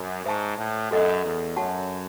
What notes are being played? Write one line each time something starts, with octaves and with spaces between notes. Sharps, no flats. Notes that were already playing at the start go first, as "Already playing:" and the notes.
Already playing: F#2
G#2 C5 E5 A5 C#6
A2
F#2 F#4 A4 D#5 F#5
E2
F#2 F#4 C#5 F#5 A5 C#6